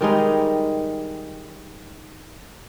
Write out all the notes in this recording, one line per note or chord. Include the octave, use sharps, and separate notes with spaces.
D#3 G3 G#3 D#4